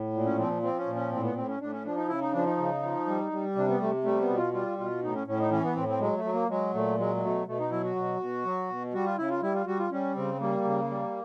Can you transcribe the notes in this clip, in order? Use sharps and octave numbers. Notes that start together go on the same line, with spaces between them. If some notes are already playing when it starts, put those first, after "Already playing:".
Already playing: A2
A#2
C#4
F3 C4
F3 C4
C#4
A#2
C#4
A2 C4
B3
A2 C4
C#4
A2 D4
C#4
F3 D4
D#4
C#3 E4
D#4
F3 D4
D#4
C#3
F3
G3
G3
C3 D4
B3
C3 A3
G3 A3
B3
B2
F4
G3 F4
B2 F4
A2 D#4
C#4
A2 C#4
D#4
E3 C#4
B3
A2 C4
C4
F#3 G#3
A3
F#3
A#3
F#3 G#3
A#2 A3
F#3 G#3
G#3
B2 A3
B2 A3
D#4
F#3 E4
F#4
B2
B2
F#3
B2
G3 F#4
F4
C#3 E4
F4
G3 E4
F4
G3 F#4
F4
G3 C#4
C#3 C4
G3 A#3
C#3
G3